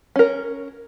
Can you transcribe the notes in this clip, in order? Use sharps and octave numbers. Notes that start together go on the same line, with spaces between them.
C#4 A#4